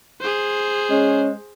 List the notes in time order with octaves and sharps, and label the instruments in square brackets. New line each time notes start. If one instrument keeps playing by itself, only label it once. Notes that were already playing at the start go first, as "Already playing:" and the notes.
[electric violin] G#4 C5
[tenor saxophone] G#3 [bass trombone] C#4